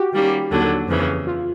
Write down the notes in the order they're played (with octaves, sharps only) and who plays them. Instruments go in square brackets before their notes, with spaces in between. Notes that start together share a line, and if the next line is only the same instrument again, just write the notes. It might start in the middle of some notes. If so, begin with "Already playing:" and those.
Already playing: [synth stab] F#4 G4
[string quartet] D#3 G3 A#3 C#4
D#2 D3 F#3
F2 C#3 E3
[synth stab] F4